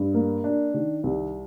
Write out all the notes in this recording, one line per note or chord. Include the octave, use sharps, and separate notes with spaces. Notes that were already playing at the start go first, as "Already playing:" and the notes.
Already playing: G2
A#3
D4
D#3
C2